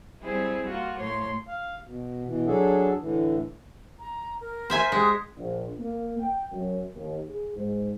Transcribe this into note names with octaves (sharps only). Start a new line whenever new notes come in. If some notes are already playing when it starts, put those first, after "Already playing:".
G3 C4 E4 G#4
A#3 F4 F#4
A2 C#5 C6
F5
B2
B2 E3
F#3 D4 F#4 G#4 A4
A2 D3 E3
A#5
A#4
C5 E5 G#5
G#3 G4 D#6 F#6
A#1
A#3
G5
F#2
D#2
G#4
G#2